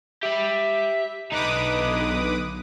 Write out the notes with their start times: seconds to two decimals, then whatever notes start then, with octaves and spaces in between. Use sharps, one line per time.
0.23 G4 E5 B5
1.32 B1 D3 D#4 B4 D#5 D6 D#6